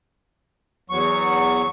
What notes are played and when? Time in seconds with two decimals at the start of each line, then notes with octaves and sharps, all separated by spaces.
0.90 E2 F#3 C#6